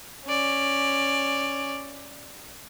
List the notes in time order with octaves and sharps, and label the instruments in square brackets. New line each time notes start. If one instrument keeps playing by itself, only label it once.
[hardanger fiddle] C#4 D5